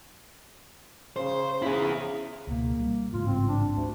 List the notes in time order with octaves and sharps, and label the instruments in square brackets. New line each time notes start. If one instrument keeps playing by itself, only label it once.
[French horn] C#3 [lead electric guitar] C5
[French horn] C#3 [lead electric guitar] E4 G#4
[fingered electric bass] C#2 B2 [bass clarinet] A#3
[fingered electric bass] G3
[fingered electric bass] A1 G#2 C#3 [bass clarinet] F4
[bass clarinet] C4
D4
D2